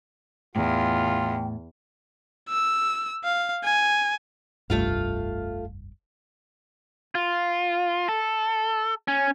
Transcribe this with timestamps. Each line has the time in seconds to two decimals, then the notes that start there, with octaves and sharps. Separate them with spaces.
0.56 E2 A2 F4 G5
2.49 E6
3.24 F5
3.64 G#5
4.70 F1 C2 G2 A3 F4 F5
7.15 F4
8.09 A4
9.08 C#4